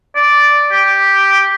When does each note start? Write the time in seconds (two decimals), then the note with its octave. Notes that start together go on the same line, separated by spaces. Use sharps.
0.15 D5
0.71 G4